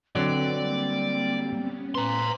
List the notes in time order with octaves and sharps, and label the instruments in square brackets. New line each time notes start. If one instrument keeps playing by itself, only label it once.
[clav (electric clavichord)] D3 F#3 [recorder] C4 [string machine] B4 D#5 [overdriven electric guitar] D5
[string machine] G3 A#3 [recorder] C4
[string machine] B3 C#4
[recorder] B4 [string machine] C5 G#5 [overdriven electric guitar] A#5 C6